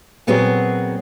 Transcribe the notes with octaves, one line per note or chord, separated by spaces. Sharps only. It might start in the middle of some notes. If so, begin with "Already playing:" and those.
A#2 F#3 B3 C4 F#4 G#4